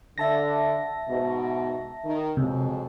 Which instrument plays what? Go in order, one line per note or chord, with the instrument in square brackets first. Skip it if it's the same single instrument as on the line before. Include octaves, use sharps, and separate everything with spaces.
[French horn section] D3 [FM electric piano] E5 A5 A#6
[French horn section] G#2 B2
D#3
[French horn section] F2 F#3 G#3 [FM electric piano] C3